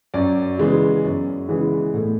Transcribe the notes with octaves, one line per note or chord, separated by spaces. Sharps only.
F#2 D5
C#3 E3 G#3 B3
F#2
C#3 E3 G#3 B3
A2